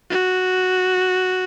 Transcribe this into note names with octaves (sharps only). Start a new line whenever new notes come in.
F#4